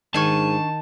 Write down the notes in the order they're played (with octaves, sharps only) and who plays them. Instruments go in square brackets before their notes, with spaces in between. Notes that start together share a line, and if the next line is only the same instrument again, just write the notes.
[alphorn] G#2 [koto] D#3 G#5 [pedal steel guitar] D4 C#6 [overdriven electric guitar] A5